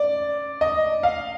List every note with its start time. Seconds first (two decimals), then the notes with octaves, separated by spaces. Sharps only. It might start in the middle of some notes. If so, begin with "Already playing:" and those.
Already playing: D5
0.61 D#5
1.03 F5